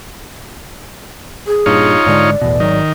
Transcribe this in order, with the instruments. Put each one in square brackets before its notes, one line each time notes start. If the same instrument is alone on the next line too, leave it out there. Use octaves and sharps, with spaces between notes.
[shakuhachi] G#4
[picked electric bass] G2 A#2 [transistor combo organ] D#4 F4 C#5
[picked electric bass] G#2 D3 G#3 [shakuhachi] D5
[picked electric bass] A1 E2 B2
[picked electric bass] G#1 F#3 [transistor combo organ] D#3